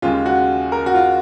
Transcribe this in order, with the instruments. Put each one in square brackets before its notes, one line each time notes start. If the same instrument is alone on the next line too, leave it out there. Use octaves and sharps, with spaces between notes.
[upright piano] D#2 C#3 G#3 F4
F#4
A#4
F#4
F4